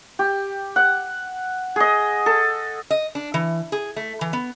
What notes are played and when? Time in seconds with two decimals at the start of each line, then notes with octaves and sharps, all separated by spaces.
0.19 G4
0.76 F#5
1.76 G#4 D#5
2.26 A4
2.90 D#5
3.15 D4
3.34 E3
3.72 G#4
3.96 A3
4.21 E3
4.33 B3